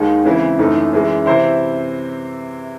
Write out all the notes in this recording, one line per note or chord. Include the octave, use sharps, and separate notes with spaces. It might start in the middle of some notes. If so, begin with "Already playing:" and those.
Already playing: D#2 D#3 G#3 D#4
C#3 E3 G#3 C4 E4
F#2 E3 A3 D#4
F#2 E3 G#3
C3 E3 C4 E4 C5